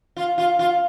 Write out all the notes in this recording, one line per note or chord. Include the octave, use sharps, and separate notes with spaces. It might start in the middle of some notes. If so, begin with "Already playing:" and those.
F4
F4
F4